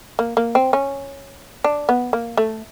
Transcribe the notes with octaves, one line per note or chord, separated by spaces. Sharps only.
A#3
A#3
C4
C#4
D4
B3
A#3
A3